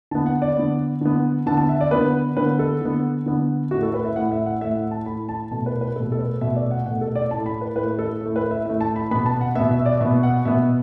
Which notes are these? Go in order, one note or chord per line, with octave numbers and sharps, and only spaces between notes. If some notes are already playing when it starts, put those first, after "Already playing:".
D3 B3 A5
F#5
D5
D3 B3
D3 B3
D3 B3 A5
A5
E5
D5
D3 B3 B4
D3 B3 B4
A4
D3 B3
D3 B3
A2 A3 F#4
A4
B4
E5
A2 A3 F#5
E5
F#5
A2 A3 E5
F#5
A5
A2 A3 B5
A5
B2 A3 A5
B4
B4
B2 A3 A4
A4
B4
B2 A3 E5
D5
F#5
B2 A3 F#5
A4
D5
A2 A3 A5
B5
B4
A2 A3 B4
A4
A2 A3
B4
E5
A2 A3 E5
A5
B5
B2 B3 B5
A5
F#5
B2 B3 E5
E5
D5
B2 B3 E5
F#5
B2 B3 E5